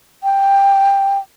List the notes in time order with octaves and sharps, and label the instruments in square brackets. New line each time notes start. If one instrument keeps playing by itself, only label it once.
[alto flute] G5